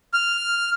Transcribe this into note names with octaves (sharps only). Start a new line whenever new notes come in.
F6